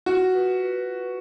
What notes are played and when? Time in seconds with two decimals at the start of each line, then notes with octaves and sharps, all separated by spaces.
0.06 F4 F#4
0.34 B4
0.60 B4